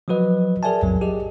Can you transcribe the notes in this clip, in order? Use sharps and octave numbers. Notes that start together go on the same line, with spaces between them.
F3 F#3 F#4 B4 D#5
G#4 A#4 D5 E5 G#5 A5
B1 F2 A2 F#3
G4 G#4 D#5